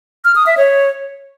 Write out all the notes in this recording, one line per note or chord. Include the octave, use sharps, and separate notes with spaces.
F6
D#6
E5
C#5